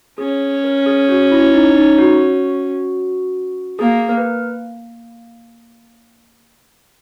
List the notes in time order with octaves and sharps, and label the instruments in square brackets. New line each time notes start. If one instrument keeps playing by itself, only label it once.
[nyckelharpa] C#4 [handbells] G#4
[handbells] A#4
G#4
F#4
E4
D#4
D#4
F#4
[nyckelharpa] A#3 [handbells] G#4
[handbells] A#4
B4